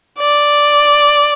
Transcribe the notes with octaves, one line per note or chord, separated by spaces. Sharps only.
D5